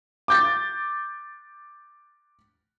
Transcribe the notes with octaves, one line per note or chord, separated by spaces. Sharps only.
D6 G6 A6